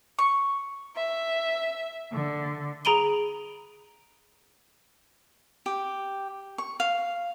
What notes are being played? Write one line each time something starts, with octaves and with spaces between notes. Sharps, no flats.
C#6
E5
D3
G#4 A#5 B5 D7 D#7 G7
G4
C#6
F5